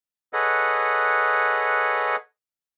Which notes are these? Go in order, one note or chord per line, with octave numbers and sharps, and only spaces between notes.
G#4 A4 B4 C#5 D#5 F#5